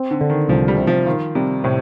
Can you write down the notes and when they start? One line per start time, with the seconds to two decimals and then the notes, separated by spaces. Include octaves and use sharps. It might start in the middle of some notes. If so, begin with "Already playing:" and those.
Already playing: C4
0.11 D3
0.21 D3
0.30 D#3
0.49 C2 F3
0.68 G3
0.77 C3
0.87 F3
1.06 D#3 F4
1.35 C3 G3
1.64 A2 C3